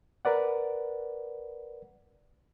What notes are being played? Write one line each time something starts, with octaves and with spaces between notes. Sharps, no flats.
A#4 B4 D5 F#5